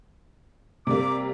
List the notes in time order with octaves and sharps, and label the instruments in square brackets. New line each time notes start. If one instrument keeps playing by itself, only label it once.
[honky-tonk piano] C3 G3 A#3 [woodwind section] D6